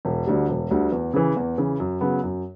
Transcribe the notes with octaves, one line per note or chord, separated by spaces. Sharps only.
E1
D2 D3 G3
E1
D2 D3 G3
E2
C#3 E3
E2
C#3 E3
F#2
C#3 F#3 B3
F#2